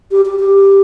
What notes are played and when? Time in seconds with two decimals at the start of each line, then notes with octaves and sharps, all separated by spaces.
0.11 G4
0.25 G4
0.39 G4